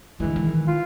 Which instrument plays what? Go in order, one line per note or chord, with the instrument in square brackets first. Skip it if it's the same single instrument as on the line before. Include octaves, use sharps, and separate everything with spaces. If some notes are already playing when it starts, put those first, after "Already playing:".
[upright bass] D3 G#3 [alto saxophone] E3
[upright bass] D#3
[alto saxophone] F4